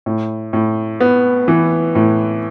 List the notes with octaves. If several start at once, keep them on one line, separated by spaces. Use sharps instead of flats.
A2
A2
B3
E3
A2